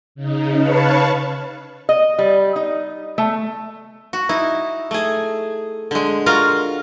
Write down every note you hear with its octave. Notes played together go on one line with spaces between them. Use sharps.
C#3 D#4
B4 C#5 F5 A5 B5 C#6
D#5
G3
D#4
A3
F#4
D#4 E4
A3 G#4
D3 G#3
F4 F#4 A#4 F5